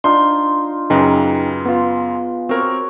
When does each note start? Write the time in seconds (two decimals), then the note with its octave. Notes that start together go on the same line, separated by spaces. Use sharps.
0.04 D4 D#4 F4 C5 C6
0.90 F#2 C#3 D#4 G#4 B4 G5 A#5
1.66 B3 F4
2.49 C4 F#4 A#4 C#5